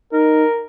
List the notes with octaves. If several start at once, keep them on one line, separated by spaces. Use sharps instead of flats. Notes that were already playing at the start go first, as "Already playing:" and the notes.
D#4 A#4